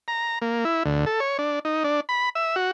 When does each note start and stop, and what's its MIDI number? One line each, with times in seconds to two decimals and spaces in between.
0.08 0.39 82
0.42 0.64 58
0.65 0.83 64
0.85 1.05 38
1.06 1.20 69
1.20 1.37 73
1.39 1.59 62
1.65 1.83 63
1.84 2.00 62
2.09 2.29 83
2.35 2.56 76
2.56 2.71 66